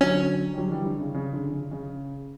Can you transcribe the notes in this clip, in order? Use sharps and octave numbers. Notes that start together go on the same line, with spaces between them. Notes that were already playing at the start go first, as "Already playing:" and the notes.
D3 F#3 C#4
G3
D3 F#3
E3 G3
D3
C#3
C#3
D3
C#3
C#3